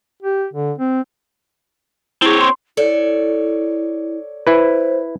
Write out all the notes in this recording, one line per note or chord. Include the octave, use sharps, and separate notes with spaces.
G4
D3
C4
C4 E4 G#4 C#5
C6
E4 A4 C#5 D5
E4 B4 C5